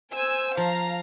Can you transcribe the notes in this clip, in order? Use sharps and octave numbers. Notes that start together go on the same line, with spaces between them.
C5 G#5 E6
F3 F5 A#5